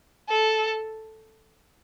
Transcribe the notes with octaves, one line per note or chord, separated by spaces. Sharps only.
A4